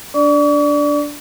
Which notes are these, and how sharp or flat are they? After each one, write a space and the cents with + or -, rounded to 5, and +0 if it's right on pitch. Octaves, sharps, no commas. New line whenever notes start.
D4 -10 D5 +0 C#6 +45